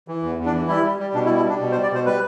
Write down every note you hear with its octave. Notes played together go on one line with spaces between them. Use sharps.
E3
E2
E2
D4
E3
G3 E4
G3
G3
B2 D4
E4
G3
E4
G3 D4
B2
C5
G3
D5
B2 C5
G3 B4